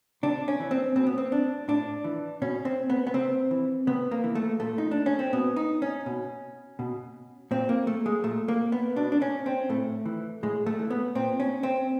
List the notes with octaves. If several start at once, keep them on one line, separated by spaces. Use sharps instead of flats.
C3 D4
C#4
E3
C4
B2 C4
B3
C4
D4
A2 D4
E3
B2 C#4
C4
B3
B3
C3 C4
E3
C3 B3
A#3
E3
A3
A#2 A3
D#4
D4
C#4
C4
B2 B3
D#4
C#4
B2
B2
A#2 C4
A#3
A3
G#3
A#2 A3
A#3
B3
B2 D4
D4
C#4
C4
A2 A3
E3
A2 G#3
A3
E3
B3
A#2 C4
C#4
C4